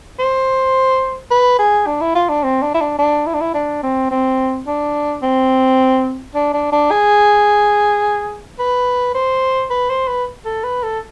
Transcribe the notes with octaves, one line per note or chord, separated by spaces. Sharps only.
C5
B4
G#4
D4
E4
F4
D4
C4
D4
E4
D4
D4
E4
D4
E4
D4
C4
C4
D4
C4
D4
D4
D4
G#4
B4
C5
B4
C5
B4
A4
B4
A4